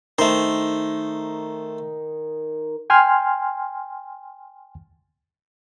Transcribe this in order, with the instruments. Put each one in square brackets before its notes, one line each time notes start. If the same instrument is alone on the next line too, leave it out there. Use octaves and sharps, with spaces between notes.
[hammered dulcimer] D#3 [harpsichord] A3 C5
[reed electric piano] G5 G#5 C6 F6